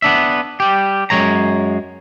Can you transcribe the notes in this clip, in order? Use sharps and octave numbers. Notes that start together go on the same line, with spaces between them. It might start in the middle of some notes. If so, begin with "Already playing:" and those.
B3 D4 E5
G3 G4
F#2 F3 G#3 C#5 A#5